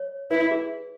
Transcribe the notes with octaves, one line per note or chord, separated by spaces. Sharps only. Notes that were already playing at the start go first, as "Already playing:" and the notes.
Already playing: C#5
E4 B4
G#4